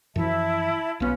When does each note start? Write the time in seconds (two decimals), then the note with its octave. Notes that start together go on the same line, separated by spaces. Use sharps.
0.16 F#2 E3 F3 E4 E5 A5
1.00 B1 B3 C#4 F4 B4